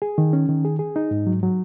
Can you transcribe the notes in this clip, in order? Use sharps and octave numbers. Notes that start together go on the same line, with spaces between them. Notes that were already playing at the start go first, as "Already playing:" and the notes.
G#4
D#3
C#4
D#3
G#4
G#4
D#4
G#2
F#3
F#3